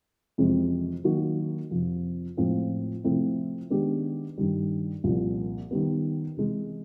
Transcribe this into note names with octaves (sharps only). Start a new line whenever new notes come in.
F2 C3 E3 G#3 C4
D#3 F#3 A#3 D#4 F#4
F2 C3 F3
A2 F3 G#3 C4
C3 F3 A3 C4 E4
D#3 G#3 B3 D4 G4
G2 D#3 G3
C2 A#2 F3
D#3 G3 B3
C3 E3 G#3